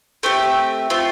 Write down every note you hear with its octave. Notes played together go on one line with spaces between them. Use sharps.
A3 C4 G4 E5
A3 C4 F4